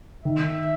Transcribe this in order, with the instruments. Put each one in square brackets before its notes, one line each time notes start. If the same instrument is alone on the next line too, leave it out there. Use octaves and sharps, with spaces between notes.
[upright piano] D#3 [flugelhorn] E5